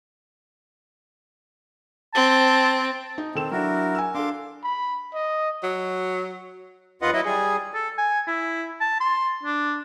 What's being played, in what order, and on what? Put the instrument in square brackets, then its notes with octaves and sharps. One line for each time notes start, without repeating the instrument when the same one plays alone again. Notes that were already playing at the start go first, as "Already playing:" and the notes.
[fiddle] C4 [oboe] A5
[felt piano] D#4
[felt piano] D#3 A4 E7 [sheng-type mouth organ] C4
[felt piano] F#3 D4 [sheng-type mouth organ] E4 F#4 A#4
[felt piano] G#5 E6
[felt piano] D4 A4 [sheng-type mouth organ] F5 C6 D6
[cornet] B5
D#5
[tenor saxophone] F#3
[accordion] D#2 F4 B4 D#5 F#5
F#3 E4 D#5
G3 G#4
[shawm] A4
G#5
E4
A5
C6
D4